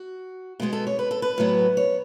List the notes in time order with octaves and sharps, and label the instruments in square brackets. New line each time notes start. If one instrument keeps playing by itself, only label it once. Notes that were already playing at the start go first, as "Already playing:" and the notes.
Already playing: [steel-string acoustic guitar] F#4
B2 G#3 B3 G#4
A4
C#5
B4
A4
B4
A2 F#3 B3
C#5